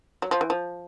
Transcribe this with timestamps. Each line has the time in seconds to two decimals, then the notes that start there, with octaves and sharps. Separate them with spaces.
0.22 F#3
0.31 F3
0.41 E3
0.50 F3